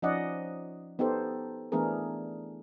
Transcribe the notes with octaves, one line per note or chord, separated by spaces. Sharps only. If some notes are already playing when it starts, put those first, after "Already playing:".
F3 C#4 D#4 D5 D#5 F#5
B3 D#4 G4 A4 C5
E3 A3 B3 D4 G#4 A#4